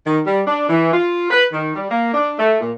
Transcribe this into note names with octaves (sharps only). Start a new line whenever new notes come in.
D#3
G3
D4
E3
F4
B4
D#3
G3
A#3
D4
A3
A#2